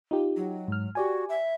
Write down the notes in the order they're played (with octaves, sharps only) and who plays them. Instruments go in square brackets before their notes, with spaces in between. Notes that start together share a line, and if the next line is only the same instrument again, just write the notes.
[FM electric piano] D#4 F4 G4
[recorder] F#3
[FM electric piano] G#2 F6
[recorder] F#4 [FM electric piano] G4 D5 G#5
[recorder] E5